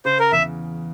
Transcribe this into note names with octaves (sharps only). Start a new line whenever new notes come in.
C#3 C5
A#4
E2 E5